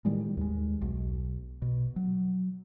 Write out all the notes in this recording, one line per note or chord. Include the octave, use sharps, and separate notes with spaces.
A2 D#3 G3 G#3
D#2 G#3
B1
B2
F#3